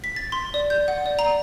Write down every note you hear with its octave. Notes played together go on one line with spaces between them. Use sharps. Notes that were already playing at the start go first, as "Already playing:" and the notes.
B6
A6
C6
D5
G6
F#5
D5
A#5